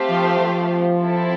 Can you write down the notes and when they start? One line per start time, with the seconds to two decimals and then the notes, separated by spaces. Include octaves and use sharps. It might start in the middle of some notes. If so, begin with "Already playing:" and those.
Already playing: A3 C4 G4 C5 F5
0.09 F3
0.40 F3
1.01 C4 E4 A4